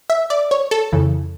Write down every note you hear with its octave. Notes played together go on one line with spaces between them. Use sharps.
E5
D5
C#5
A4
F2 C#3 E3